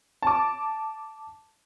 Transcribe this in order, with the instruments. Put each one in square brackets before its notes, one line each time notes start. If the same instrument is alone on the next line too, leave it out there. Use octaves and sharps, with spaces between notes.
[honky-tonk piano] A5 D6